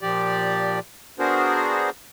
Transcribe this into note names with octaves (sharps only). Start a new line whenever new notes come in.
A#2 F3 G4 D5
B3 D4 F#4 G#4 A#4 C5